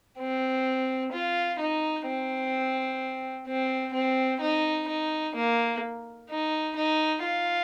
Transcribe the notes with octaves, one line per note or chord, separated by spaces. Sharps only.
C4
F4
D#4
C4
C4
C4
D#4
D#4
A#3
D#4
D#4
F4